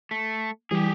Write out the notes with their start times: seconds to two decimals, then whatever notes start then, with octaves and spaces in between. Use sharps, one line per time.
0.11 A3
0.71 E3 G3 G4 G#4